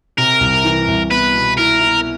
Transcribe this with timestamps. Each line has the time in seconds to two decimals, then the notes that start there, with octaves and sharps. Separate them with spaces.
0.18 C3 A#4
0.40 C2
0.65 E3
0.88 C2
1.11 B3 B4
1.34 B2
1.58 E4 A#4
1.81 E4